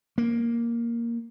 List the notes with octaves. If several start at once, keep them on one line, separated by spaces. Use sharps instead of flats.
A#3